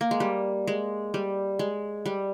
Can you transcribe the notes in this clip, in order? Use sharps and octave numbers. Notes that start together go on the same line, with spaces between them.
A#3
G#3
G3
G#3
G3
G#3
G3